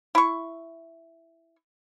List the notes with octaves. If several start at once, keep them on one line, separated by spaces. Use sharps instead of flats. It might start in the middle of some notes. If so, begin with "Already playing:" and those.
E4 C#6